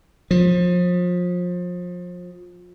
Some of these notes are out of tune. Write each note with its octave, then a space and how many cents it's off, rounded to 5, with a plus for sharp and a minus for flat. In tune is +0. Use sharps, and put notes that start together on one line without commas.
F3 +30